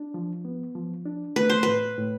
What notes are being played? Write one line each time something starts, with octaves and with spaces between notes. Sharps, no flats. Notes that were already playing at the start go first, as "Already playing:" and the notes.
Already playing: D4
F3
B3
F3
D4
A3 B4
C5
A2 B4
A2